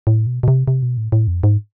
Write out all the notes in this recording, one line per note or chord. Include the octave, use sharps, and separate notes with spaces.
A2
B2
B2
C3
C3
B2
A2
A2
F2
G#2